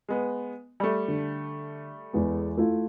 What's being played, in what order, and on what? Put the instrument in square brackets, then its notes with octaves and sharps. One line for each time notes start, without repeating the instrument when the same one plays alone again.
[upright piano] G#3 B3
G3 A3
[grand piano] D3
E2 G#3 B3
A3 E4 F4